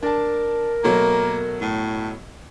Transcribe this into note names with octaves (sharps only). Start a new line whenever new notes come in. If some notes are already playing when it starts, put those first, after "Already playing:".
D4 A#4 A5
B2 F#3 A3 A#3
A2